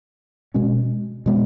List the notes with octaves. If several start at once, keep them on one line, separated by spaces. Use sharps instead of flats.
B2 G#3 C#4
B2 G#3 B3